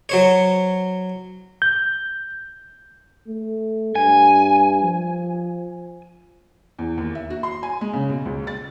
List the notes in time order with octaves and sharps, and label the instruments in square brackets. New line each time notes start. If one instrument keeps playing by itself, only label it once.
[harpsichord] F#3 C5 C#5
[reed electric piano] G6
[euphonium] A3
[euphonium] G2 [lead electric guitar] G#5
[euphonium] F3
[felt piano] E2
D#2
E5
F#4
C6
G#5
G#3
C#3
B2
C#2
A6